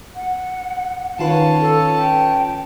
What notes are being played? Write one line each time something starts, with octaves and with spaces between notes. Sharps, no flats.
F#5
D#3 C#4 F4 B4 A5
A4
G5